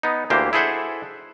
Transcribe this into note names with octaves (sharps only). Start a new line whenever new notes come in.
B3 D#4
D2 E3 A#3 G4 C5
E4 G#4 A4 C5 E5 F#5